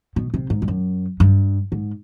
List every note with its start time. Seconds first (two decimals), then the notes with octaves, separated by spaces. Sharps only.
0.16 B2
0.34 C3
0.50 G#2
0.62 G2
0.68 F#2
1.20 G2
1.72 G#2